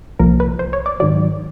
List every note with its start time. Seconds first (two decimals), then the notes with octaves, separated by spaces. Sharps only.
0.19 C2 A#2 F3 A#4
0.40 B4
0.59 C5
0.73 C#5
0.86 D5
1.00 G#2 D#3 F#3 D5